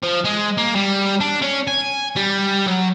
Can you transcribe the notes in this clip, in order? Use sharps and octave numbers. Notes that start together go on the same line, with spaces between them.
F3
G#3
A#3
G3
D4
C#4
G#5
G3
F#3